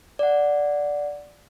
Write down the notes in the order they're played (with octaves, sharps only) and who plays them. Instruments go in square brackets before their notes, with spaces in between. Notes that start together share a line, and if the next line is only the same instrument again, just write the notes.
[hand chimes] D5 F#5